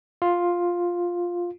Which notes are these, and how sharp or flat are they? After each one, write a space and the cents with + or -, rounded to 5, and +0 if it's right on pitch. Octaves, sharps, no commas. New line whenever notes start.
F4 +5